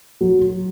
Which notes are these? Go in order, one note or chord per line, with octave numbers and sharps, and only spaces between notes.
F#3